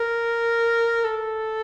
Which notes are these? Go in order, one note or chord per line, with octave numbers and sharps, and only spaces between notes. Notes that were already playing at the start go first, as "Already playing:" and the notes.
Already playing: A#4
A4